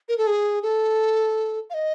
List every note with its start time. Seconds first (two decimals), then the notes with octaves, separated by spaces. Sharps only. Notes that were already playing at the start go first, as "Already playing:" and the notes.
0.09 A#4
0.18 A4
0.27 G#4
0.63 A4
1.70 F5
1.74 D#5